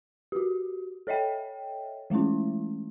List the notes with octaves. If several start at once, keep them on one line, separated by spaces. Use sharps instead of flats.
F#4 G4
A4 C#5 D#5 E5 G5
E3 G#3 A3 C#4 E4